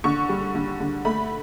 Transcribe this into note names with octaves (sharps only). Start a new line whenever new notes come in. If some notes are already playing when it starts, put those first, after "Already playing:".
D3 C#6
G3
D3
D3
A3 B5